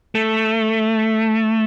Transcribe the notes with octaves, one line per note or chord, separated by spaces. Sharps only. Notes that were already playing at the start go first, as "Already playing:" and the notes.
A3